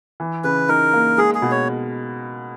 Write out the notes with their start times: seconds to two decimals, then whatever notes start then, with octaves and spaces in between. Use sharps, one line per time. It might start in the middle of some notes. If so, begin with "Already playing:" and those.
0.20 E3
0.44 C#3 B4
0.69 D#4 A#4
0.93 A#3
1.18 G#3 G#4
1.35 G#4
1.42 B2
1.51 C#5